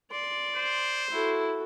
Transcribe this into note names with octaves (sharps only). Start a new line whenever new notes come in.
D5 C6
C5
E4 F#4 A4